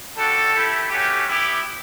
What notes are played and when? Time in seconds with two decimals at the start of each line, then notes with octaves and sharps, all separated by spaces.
0.17 G3 D4 F#4 A4
0.54 A3 E4 G4
0.90 A3 C#4 F#4 G4
1.26 B3 E4 G4